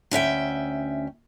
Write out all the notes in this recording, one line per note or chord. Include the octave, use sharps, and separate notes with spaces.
D2 C#4 E5 G5